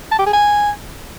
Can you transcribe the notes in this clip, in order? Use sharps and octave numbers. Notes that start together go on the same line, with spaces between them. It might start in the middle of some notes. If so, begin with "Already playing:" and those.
A5
G4
G#4
G#5